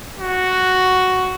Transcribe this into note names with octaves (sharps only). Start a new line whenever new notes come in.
F#4